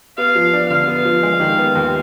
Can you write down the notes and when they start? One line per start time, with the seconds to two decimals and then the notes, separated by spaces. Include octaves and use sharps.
0.18 B3 F5
0.35 F3
0.53 D4
0.70 D3 F5
0.87 B3
1.05 F3
1.23 G#3
1.40 D#3
1.58 B3
1.75 D#2